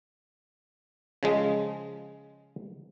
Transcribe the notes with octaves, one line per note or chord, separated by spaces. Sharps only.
C#3 F3 G#3